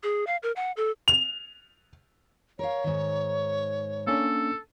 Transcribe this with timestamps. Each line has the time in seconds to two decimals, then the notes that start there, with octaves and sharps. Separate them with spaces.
0.03 G#4
0.27 F5
0.43 A#4
0.56 F#5
0.77 A4
1.08 F7
2.59 A#4 C#5 F5
2.84 G#2 D#3
4.07 A#3 C#4 D4 A4